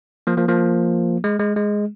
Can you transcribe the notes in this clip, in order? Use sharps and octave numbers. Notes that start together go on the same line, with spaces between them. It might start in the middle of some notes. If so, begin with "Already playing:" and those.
F3 A#3
F3 A#3
F3 A#3
G#3
G#3
G#3